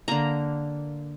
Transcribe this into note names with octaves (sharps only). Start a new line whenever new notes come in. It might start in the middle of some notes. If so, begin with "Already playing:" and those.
D3 A#3 A#5